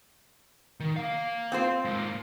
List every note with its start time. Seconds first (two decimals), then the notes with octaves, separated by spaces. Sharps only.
0.80 D#3
0.96 A#3 F5
1.52 C4 F4 C5
1.85 G#2 A#3